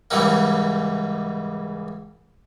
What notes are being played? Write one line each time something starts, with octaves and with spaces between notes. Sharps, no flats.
C#2 G#2 C#3 E3 G3 A#3